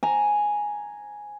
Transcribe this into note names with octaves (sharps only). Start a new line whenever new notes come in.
G#5 A#5